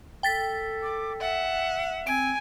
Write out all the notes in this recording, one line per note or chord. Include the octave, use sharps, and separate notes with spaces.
A4 G5 A6 B6
D6
E5 F#5
C4 G#5 D7